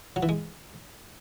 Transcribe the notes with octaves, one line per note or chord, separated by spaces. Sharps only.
F#3
E3
G#3